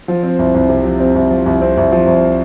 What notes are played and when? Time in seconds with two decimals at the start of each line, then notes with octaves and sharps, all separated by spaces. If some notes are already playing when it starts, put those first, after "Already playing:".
0.08 F3
0.23 C4
0.39 C2
0.54 C2
0.69 C3
0.84 F3
1.00 C4
1.15 C2
1.30 F3
1.46 C2
1.61 C4
1.77 C2
1.92 F3
2.07 C2